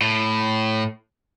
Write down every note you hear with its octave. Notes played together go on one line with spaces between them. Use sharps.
A2